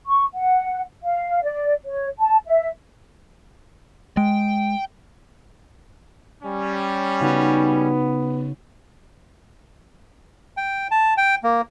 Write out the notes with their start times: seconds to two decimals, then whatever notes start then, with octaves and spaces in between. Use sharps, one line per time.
0.07 C#6
0.34 F#5
1.04 F5
1.43 D5
1.85 C#5
2.19 A5
2.46 E5
4.17 G#3 G5
6.43 G3 C#4
7.21 C#3 B3 D#4 F#4
10.57 G5
10.91 A5
11.17 G5
11.43 A#3